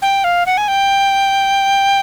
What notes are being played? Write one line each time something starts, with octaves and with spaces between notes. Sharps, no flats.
G5
F5
F#5
G#5
G5